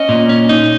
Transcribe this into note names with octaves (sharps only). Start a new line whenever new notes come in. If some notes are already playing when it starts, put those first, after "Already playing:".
Already playing: C#4 D#5
A#2
C#4
D#4